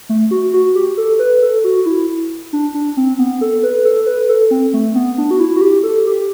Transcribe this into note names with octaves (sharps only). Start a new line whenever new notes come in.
A3
F#4
F#4
G4
A4
B4
A4
F#4
E4
D4
D4
C4
B3
A4
B4
A4
B4
A4
C4
A3
B3
D4
F#4
E4
F#4
G4
A4
G4